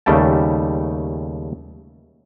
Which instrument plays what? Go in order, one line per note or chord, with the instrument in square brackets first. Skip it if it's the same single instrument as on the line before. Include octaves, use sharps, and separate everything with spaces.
[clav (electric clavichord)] D#2 C#3 G3 A3 G5 A5